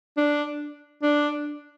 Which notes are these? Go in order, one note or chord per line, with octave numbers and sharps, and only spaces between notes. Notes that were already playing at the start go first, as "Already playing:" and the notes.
D4
D4